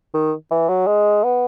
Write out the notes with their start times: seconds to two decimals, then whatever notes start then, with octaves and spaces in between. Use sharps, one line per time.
0.14 D#3
0.51 E3
0.69 F#3
0.87 G#3
1.24 B3